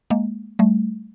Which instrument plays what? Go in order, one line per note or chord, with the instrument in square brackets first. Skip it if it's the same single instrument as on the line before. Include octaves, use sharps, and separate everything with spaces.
[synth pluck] G#3 A#3
G3 A3